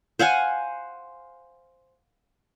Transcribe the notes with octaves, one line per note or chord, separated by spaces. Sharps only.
C5 F5 F#5 G#5